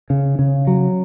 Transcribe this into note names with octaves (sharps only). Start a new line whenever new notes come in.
C#3
C#3
F#3